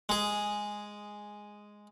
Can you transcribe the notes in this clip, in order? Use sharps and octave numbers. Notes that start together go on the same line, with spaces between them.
G#3 G#4